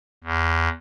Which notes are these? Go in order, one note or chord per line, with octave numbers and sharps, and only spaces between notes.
E2